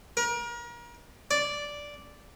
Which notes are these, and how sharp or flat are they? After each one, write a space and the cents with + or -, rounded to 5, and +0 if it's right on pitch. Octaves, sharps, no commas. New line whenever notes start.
A#4 +35
D5 -5